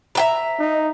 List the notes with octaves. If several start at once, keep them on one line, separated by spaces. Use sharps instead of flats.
E5 G5 A#5
D#4